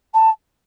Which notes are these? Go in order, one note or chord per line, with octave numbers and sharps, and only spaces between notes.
A5